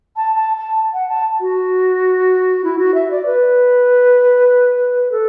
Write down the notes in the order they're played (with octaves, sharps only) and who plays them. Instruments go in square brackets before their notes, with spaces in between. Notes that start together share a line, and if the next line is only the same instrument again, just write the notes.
[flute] A5
A5
A5
F#5
A5
F#4
E4
F#4
E5
D5
B4
A4